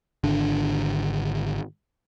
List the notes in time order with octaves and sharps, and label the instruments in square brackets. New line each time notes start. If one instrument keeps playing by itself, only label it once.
[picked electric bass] G#1 D3 D4